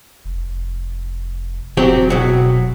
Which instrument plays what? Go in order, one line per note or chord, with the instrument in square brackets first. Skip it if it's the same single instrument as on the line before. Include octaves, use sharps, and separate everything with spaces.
[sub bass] F1
[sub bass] F1 [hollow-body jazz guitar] F#3 C4 G4
[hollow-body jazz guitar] B2 F#3